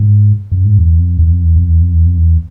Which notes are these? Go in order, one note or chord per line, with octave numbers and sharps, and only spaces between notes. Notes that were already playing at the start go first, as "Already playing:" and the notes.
Already playing: G#2
F#2
G#2
E2
F2
E2
F2
E2
F2
E2
F2
E2
F2
E2